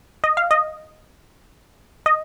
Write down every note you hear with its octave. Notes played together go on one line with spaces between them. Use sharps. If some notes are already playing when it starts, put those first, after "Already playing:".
D#5
F5
D#5
D#5